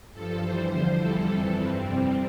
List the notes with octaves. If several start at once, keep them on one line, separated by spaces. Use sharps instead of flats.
G2 F3 A4
G2 E3 G3 C5
E2 D3 F3 C5
E2 E3 G3 A4
F2 C3 E3 G3
G2 E3 G3 C4
F2 C3 G3